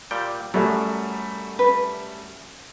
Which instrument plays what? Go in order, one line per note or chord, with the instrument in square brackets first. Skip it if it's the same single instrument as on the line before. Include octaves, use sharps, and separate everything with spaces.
[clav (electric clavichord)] A#2 G3 G5
[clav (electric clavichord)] F#2 F#3 [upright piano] G3 A3
[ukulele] B4